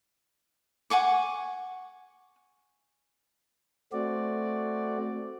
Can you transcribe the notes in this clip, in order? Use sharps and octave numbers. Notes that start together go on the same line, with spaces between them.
F#5 G#5 C#6 D6
A3 C4 F#4 D5